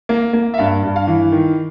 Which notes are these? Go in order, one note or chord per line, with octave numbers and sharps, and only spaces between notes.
A#3
A#3
E5
G2 F5
G2
F5
E3
D#3